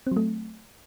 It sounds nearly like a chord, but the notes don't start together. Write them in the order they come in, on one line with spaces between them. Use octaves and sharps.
C4 F#3 A3